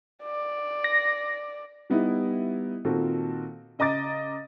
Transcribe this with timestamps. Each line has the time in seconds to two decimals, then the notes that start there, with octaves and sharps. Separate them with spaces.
0.23 D5
0.84 A#6
1.90 G3 B3 D#4 E4
2.85 A#2 D#3 C4 F#4 A4
3.79 C#3 D#5 A#5 D6 A6